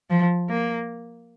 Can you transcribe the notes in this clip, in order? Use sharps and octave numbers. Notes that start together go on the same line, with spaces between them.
F3
A#3